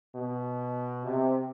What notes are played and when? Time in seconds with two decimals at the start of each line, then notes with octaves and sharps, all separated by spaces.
0.15 B2
1.05 C3